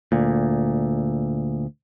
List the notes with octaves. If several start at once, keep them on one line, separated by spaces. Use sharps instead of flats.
D2 A#2